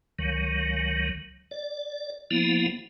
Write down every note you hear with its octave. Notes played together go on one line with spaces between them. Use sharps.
C#2 D#3 F#3
D5
F3 A#3 B3 E4